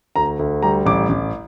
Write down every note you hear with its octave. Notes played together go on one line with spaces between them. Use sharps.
D2 A#5
D2
G3 A#5
A1 D6
A1